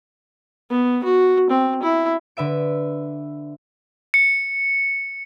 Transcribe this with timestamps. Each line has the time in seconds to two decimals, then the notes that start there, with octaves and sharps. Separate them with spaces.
0.70 B3
1.04 F#4
1.50 C4
1.83 E4
2.37 D3 B4 E5 D7
4.14 C#7